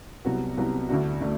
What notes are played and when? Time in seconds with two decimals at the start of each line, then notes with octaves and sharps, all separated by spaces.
0.25 C2 C3 F#3 B3 F#4
0.57 C2 C3 F#3 B3 F#4
0.89 D2 D3 A3 D4 F#4
1.21 D3 A3 D4 F#4